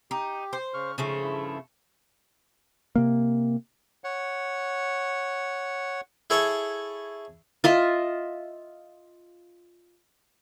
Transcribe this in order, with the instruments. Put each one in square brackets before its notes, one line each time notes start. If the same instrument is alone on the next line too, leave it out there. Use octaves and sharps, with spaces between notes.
[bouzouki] D#4 [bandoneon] G4
[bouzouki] C5
[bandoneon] C#3 C#6 F6
[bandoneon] G#2 [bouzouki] C#3 F3 A3
[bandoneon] G2 E4
[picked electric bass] C3 A#3
[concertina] C#5 F#5
[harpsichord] E4 G#4 A4 C#5
[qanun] F4 D#5 E5